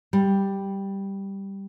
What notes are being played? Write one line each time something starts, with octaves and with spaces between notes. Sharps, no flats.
G3